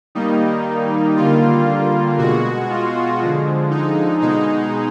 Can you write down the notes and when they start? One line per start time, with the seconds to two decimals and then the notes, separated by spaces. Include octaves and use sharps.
0.15 D#3 G3 A#3 D#4
1.16 D3 G3 A#3 F4
2.18 B2 G#3 F#4
2.69 F4
3.21 D3 F3 G#3
3.71 D#4
4.22 B2 G#3 D#4